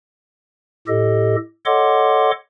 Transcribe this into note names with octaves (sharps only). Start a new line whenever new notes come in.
A2 G4 A4 D#5
A4 C#5 D#5 F#5 C6 D6